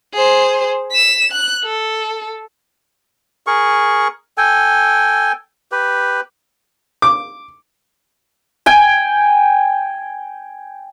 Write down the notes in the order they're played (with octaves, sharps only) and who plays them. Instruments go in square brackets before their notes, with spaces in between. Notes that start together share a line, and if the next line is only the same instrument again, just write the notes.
[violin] G#4 C5
B6 E7
F#6
A4
[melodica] G#4 A#4 C#6
A4 G5 G#5
G4 B4
[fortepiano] D6
[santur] G5 G#5